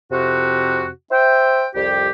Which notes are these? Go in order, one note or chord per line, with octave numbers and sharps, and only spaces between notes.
F2 C3 F#4
C5 E5 G5
C2 F2 G3 G4